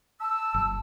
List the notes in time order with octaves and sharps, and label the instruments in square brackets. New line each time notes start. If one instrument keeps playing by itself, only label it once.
[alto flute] A5 [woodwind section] E6
[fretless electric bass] F#1